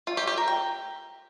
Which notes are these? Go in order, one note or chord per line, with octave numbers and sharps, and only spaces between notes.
F4
G4
G4
A#4
G5